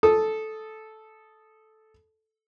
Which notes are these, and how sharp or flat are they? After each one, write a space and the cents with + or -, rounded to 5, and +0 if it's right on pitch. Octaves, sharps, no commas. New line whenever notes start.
A4 -10 D#6 +0